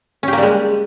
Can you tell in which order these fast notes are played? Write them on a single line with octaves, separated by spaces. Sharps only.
C#4 G4 A#3 G3 G#3